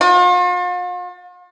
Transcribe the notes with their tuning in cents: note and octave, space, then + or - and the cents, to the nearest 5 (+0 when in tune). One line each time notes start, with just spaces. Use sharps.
F4 +45